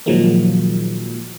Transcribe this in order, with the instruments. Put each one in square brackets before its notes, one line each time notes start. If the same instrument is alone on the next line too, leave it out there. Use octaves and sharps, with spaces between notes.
[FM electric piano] A#2 D#3 F3 F#3 G#3 A#3